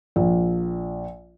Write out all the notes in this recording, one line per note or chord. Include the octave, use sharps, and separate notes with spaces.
A#1